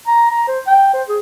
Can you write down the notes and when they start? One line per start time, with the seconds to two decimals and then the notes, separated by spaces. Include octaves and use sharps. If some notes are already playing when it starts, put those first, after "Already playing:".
0.07 A#5
0.31 A#5
0.48 C5
0.67 G5
0.93 C5
1.08 G#4